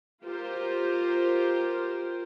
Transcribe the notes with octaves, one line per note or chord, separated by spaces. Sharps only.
F4 G4 A#4 C5